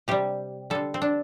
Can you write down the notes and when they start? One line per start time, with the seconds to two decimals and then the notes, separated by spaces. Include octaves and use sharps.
0.08 C3 G3 G4
0.70 D3 G3 A4
0.94 C4
1.02 D4